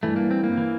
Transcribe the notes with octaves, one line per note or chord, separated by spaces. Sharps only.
G2 E3 A3
A#3
C4
A#3
E3